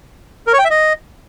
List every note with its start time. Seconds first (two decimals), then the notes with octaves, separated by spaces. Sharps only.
0.47 A#4
0.53 C#5
0.59 G5
0.65 E5
0.70 D#5